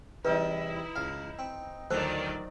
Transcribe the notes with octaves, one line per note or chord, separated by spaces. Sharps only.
E2 C3 G3 D#4 E4 B4
C#2 F5
C4
D2 D#3 F3 F#3 A4 C5 D5